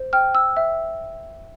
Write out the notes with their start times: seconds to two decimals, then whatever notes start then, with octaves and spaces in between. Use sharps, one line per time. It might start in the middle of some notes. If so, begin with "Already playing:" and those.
Already playing: C5
0.13 G5 F6
0.35 E6
0.57 E5